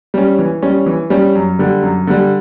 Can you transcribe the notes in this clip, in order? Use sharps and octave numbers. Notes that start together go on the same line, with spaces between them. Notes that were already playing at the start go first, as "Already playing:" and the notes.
G3 C#4
E3
G3 C#4
E3
G3 C#4
F#2
D3 G3
F#2
D3 G3